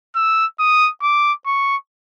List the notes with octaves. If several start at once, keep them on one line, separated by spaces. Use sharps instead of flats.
E6
D#6
D6
C#6